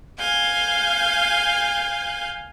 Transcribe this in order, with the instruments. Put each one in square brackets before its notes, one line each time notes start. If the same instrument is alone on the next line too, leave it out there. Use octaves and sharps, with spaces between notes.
[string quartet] F5 G#5 G6